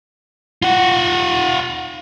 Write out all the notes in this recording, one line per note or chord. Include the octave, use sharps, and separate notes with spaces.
F4 F#5